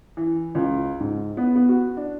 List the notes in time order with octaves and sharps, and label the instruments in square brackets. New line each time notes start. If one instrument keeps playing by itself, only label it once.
[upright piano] E3
C#2
G#2
B3
B3
F#4
D4